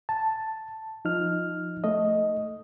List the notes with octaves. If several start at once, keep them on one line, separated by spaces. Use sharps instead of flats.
A5
F3 D#4 F6
A3 D#5